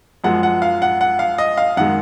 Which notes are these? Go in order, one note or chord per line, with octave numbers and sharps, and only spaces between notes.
F#2 F3 G#3 F#5
F#5
F5
F#5
F#5
F5
D#5
F5
F#2 D#3 G#3 F#5